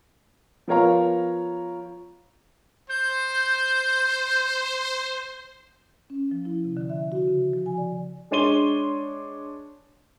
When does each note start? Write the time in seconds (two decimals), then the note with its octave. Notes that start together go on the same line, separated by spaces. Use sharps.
0.68 F3 B3 A#4 C#5 F5 A#5
2.90 C5 G6
6.10 C#4
6.31 F3
6.45 E4
6.64 C3
6.77 D3
6.90 E5
7.12 F#4
7.28 C#3
7.54 F3
7.66 G#5
7.78 D5
8.31 G#3 D4 C#5 C6 D#7 G7